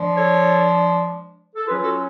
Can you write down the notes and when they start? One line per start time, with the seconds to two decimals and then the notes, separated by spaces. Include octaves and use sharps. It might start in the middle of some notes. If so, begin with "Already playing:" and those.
Already playing: F3 G#3 D4
0.16 A4 C#5
1.56 A4
1.66 F#3 C#4 F4 G#4 B4
1.83 F#4 A4